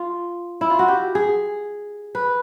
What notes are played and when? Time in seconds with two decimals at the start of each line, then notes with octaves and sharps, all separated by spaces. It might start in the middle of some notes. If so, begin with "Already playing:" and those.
Already playing: F4
0.61 E4
0.70 F4
0.79 F#4
0.88 G4
1.15 G#4
2.15 B4